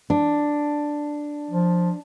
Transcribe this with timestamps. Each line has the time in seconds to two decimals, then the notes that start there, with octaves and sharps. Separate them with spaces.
0.10 D4
1.51 F3